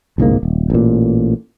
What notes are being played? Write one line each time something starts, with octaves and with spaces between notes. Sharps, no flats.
G1 C2 G#2 A#3
D#1
A1 A#2